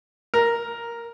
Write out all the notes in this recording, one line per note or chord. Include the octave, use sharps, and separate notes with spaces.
A#4